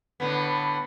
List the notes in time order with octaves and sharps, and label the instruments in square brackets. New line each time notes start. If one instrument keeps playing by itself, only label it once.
[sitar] A2 D3 B3